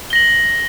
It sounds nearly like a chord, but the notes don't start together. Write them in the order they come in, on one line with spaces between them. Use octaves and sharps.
G7 A#6 F#7